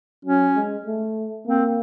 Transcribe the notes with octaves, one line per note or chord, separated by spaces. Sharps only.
F#3 C#4
G#3
A3
A#3 C4